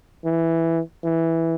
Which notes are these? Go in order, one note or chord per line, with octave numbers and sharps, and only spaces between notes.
E3
E3